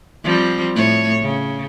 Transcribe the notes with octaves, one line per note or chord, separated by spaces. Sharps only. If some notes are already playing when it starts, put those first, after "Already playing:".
F3 G3 C4
A2 C#5
C#3